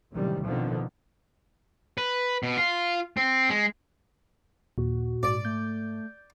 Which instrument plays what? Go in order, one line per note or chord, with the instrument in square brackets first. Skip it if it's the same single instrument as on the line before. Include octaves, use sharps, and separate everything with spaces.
[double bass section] A1 F#2 A2 C3 D#3 G3
F2 B2 D3 D#3 F3
[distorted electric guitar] B4
B2
F4
C4
G#3
[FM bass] D#2 [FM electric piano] A#2 [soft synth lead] F#4
[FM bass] G#2 [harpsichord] D5
[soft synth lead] A3 [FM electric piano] G6